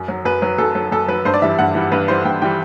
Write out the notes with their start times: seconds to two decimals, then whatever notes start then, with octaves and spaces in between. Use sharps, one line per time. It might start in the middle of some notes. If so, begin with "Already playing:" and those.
Already playing: F#2
0.08 F#3
0.25 F#2 B4
0.42 F#3
0.58 F#2 A4
0.75 F#3 A4
0.92 F#2 A4
1.08 F#3 B4
1.25 G2 C5
1.34 D5
1.42 E3 G3 E5
1.59 G2 F#5
1.75 E3 G3
1.92 G2 B4
2.08 E3 G3 C5
2.25 G2 G5
2.42 E3 G3 G5